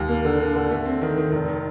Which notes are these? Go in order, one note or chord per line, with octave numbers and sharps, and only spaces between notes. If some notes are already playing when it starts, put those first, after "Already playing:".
Already playing: D#2
A#3
D3
D3
D3
A3
C4
D#3
D#3
F1
D#3